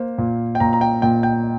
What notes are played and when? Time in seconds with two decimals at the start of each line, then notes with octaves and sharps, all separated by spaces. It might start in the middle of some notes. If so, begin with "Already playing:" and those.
Already playing: A#3 C5
0.18 A#2
0.55 G5
0.60 A#2 A#5
0.73 A#5
0.81 G5
1.02 A#2 G5
1.23 G5